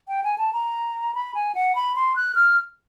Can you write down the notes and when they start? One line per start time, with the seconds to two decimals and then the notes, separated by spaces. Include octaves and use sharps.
0.08 G5
0.24 G#5
0.38 A5
0.53 A#5
1.15 B5
1.35 G#5
1.55 F#5
1.75 B5
1.96 C6
2.16 F#6
2.35 F6